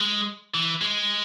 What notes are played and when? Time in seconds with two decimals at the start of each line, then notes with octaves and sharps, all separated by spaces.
0.01 G#3
0.54 E3
0.81 G#3